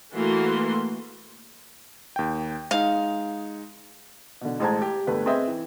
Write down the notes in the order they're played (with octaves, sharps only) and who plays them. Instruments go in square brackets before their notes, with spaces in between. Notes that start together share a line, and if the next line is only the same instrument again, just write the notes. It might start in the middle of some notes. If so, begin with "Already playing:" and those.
[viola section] E3 A3 A#3 F#4 C6
[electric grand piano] D#2 G5
[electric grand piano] G#3 D#4 [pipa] F5
[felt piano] B2 D3
A1 G#3 C5 A5 A#5 G#6
G4
G1 A3 B4
C4 G#4 B4 D#5 E5
E3